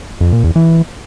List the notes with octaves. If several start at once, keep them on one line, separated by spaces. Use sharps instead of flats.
F2
A#2
E2
E3